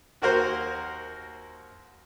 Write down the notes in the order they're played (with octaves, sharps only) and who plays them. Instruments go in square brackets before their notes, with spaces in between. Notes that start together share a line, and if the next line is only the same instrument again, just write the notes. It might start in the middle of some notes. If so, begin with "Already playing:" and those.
[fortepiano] D#2 A#3 F#4 A#4 C5